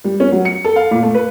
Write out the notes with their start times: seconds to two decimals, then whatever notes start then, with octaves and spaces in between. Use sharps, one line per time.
0.04 G3
0.20 C#4
0.32 F#3
0.45 C#7
0.65 A4
0.76 F5
0.91 A#2
1.03 A3
1.14 B4